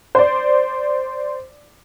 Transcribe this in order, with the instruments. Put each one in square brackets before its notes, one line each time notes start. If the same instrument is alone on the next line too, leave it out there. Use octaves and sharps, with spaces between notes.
[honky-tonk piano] C5 D5